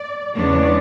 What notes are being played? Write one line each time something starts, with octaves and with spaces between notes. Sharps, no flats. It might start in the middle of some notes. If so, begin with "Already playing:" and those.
Already playing: D5
E2 C#3 G#3 B3 D4 C#5